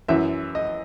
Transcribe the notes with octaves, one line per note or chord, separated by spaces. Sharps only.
F#2 E3 E5
D#5